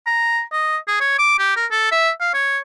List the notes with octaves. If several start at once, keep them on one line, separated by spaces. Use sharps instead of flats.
A#5
D#5
G#4
C#5
D6
G4
A#4
A4
E5
F5
C#5